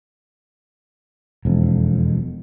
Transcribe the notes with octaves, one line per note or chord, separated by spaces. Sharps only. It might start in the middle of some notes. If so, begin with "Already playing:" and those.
E1 F2